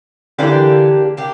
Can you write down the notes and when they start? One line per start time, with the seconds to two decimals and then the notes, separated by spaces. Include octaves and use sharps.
0.38 D3 E3 A#3 D4 G4
1.17 A#3 D4 G4